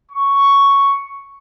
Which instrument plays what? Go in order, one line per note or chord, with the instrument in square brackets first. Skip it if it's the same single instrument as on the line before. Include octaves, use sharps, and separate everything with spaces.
[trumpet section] C#6